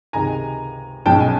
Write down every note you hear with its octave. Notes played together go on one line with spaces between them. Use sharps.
C#2 C3 D#3 G#3 G#5 A#5
B1 B2 G#3 C#4 G5 A5
G#5